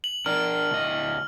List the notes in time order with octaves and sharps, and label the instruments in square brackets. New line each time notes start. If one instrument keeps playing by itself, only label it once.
[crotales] F#7
[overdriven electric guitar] D4 A#4 [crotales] F6
[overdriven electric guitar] D2 D#5